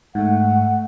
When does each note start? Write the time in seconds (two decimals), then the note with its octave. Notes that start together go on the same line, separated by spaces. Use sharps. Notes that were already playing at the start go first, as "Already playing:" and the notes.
0.15 G#2 A3 F#5